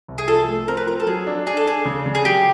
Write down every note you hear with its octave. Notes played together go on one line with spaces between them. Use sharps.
C2
G#4
F3 A4
A3
C4 A#4
B4
F3 A#4
A4
F#3 G#4
D4
D4 G#4
A4
D4 G#4
C#3
C#3
G#4
F#3 G4